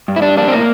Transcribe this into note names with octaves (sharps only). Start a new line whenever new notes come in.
G2
E4
G3 D4
A#3 D4
C4
A2 A#3